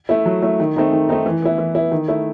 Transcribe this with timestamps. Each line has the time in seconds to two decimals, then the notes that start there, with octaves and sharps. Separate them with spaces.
0.09 A3 E4
0.26 F#3
0.43 A3 E4
0.60 D#3
0.76 A3 C4 D#4
0.92 D#3
1.09 A3 C4 D#4
1.26 E3
1.42 B3 E4
1.58 E3
1.75 B3 E4
1.92 D#3
2.08 A3 E4